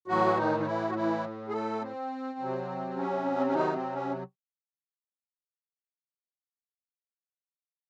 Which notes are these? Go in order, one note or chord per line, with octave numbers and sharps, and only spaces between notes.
A2 E3 F#3 F#4
D#3 D#4
D#4
E3 E4
F#4
E3 E4
G#4
A3 A4
C4
C3 F#3
C#4
C4
C#4
D#3 D#4
C4
C#4